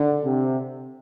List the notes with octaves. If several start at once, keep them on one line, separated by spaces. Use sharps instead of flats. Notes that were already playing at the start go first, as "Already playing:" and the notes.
Already playing: D3
C3